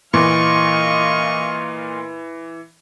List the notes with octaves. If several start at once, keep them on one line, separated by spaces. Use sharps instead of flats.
A#2 E3 D#5 F5 C#6